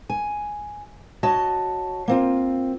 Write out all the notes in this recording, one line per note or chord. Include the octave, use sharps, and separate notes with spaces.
G#5
F#4 C#5 D#5 A5
A#3 C4 F4